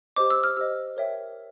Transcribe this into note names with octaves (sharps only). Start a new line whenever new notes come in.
G4 C5 D#5 D6
E6
F6
G4 C5 D#5 E6
A#4 C#5 E5 G5